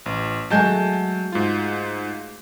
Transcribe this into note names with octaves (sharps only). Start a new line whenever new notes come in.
A1
F#3 G#3 A3 F#4 A5 G6
G#2 F4